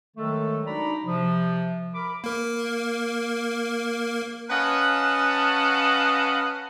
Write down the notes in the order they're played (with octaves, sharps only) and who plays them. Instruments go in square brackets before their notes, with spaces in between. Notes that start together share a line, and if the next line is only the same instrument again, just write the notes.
[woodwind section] D#3 F#3 G#3 A3 A4
D4 D#4 F#4 D5 A#5 B5
C3 F3
A#4 B5 D6
[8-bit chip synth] A#3 A#4
[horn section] C#4 B4 D#5 F5 F#5 A5